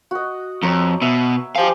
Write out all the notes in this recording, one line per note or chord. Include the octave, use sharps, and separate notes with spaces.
F#4 D#5
F2 C#5 A#5
B2 E5
G4 C5 D#5 F5 G#5